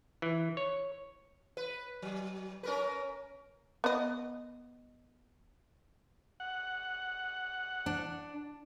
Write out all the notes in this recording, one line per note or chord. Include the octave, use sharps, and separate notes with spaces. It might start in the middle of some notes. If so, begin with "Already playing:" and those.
E3
C#5
B4
F#3
C#4 A#4 B4
B3 D#5
F#5
D4